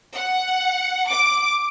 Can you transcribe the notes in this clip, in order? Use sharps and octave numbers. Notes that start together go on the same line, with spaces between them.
F#5
D6